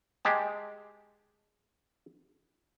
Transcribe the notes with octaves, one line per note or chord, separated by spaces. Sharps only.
G#3 G4 A5